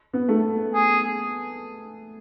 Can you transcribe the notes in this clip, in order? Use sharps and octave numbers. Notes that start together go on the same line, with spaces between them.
B3
A3
G#4